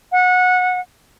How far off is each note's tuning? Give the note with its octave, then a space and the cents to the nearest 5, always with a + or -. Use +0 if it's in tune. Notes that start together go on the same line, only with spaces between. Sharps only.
F#5 -20